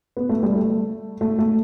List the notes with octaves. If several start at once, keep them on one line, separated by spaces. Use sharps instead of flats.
B3
A3
G3
A3
A3
A3